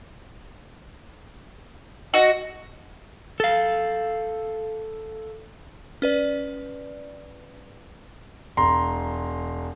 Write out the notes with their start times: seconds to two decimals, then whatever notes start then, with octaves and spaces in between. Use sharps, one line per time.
2.14 F#4 D#5
3.40 A4 F5
6.02 C#4 B4 D5
8.57 E1 A#5 C6